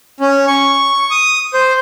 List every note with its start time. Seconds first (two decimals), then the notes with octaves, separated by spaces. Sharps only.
0.20 C#4
0.47 C#6
1.11 D#6
1.54 C5